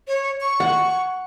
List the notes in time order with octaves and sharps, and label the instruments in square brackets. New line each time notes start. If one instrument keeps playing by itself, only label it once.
[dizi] C#5
C#6
[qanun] F#5